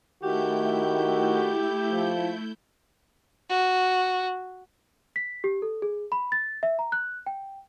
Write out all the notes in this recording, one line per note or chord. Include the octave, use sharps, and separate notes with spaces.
D#3 A3 E4 F#4 G4 G6
F3
F#4
B6
G4
A4
G#4
B5
A6
E5
A#5
F#6
G5